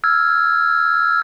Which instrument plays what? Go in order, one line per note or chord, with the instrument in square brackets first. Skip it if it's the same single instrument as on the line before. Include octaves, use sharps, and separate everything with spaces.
[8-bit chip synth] E6 F6 G#6